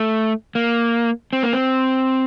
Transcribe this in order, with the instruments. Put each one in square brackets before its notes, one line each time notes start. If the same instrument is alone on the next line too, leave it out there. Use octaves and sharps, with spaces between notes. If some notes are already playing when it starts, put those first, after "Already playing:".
Already playing: [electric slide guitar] A3
A#3
C4
A#3
C4